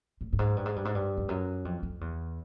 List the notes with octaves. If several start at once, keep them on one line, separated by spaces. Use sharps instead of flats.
A2
G2
G#2
G2
G#2
G2
G#2
G2
F2
F#2
F2
F2
E2